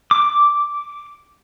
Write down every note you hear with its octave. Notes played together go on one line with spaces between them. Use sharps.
D6